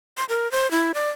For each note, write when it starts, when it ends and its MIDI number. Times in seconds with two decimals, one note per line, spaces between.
0.17 0.25 84
0.29 0.50 70
0.52 0.70 72
0.71 0.92 64
0.94 1.10 74